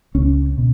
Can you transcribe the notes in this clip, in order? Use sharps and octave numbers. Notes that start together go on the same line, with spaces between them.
C#2 C#4
B2